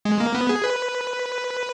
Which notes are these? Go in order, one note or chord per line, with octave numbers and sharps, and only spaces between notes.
G#3
A#3
B3
G#4
B4